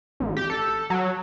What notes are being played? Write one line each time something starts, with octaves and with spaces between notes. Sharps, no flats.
A1
G4
A4
F#3